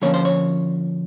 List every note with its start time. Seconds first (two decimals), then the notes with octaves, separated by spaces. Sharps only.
0.02 D3 F3 A#3 C#4 C#5
0.14 C5
0.25 C#5